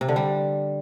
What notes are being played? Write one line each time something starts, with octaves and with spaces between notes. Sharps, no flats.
C3
D3
G3